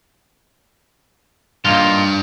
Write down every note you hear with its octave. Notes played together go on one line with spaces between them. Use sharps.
G2 A#3 D#4 F4